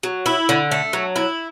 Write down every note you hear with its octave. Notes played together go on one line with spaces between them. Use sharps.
F#3
E4
D3
A3
F#3
E4